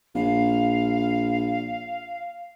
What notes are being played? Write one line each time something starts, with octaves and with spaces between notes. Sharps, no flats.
A#1 F5